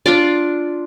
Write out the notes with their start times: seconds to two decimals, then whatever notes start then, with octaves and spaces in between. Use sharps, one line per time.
0.06 D4 F4 D5